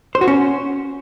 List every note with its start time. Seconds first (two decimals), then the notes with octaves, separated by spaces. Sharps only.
0.15 C5
0.21 F#4
0.28 C#4